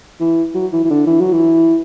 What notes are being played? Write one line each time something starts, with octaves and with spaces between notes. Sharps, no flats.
E3
F#3
E3
E3
D3
E3
F#3
E3